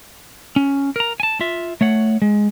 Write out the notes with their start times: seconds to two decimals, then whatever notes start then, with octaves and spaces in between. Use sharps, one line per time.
0.56 C#4
0.96 A#4 A#5
1.20 G#5 A5
1.41 F4 E5
1.81 A3 C#5 F#5
2.22 G#3